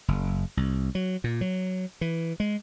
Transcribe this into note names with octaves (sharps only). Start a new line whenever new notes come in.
F#1
C2
F#3
A#2
F#3
E3
G#3